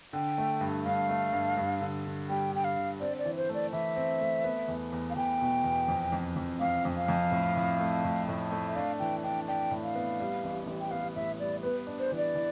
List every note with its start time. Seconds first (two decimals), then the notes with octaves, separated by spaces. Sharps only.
0.13 D3 G5
0.38 A3
0.61 G2
0.85 G2 F5
1.09 A3
1.33 G2
1.57 G2
1.81 D3
2.05 D3
2.29 G3 G5
2.52 D3 G5
2.64 F5
2.77 D3
3.00 C4 D5
3.18 D5
3.25 E3
3.37 C5
3.49 A3 D5
3.72 E3 E5
3.96 C4
4.21 A3
4.44 B3
4.68 E2
4.92 E2
5.10 F5
5.16 E2 G5
5.41 B2
5.64 E2
5.88 F2
6.12 F2
6.36 F2
6.60 F2 F5
6.85 F2
6.97 F5
7.08 F2
7.32 A2
7.56 A2
7.79 A3
8.04 A2
8.29 A2
8.51 A3
8.67 E5
8.76 D4 F5
8.99 E3 G5
9.23 D4 G5
9.48 D4 G5
9.71 A2
9.83 F5
9.95 B3
10.20 G3
10.44 A1
10.67 A1
10.80 G5
10.91 B3 F5
11.15 A2 E5
11.39 G3 D5
11.63 B3 B4
11.87 D4
11.99 C5
12.12 E3
12.17 D5
12.35 E3